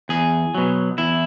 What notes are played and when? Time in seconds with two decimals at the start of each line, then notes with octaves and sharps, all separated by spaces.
0.09 E2 G#4
0.55 B2 F#3
0.98 E2 E4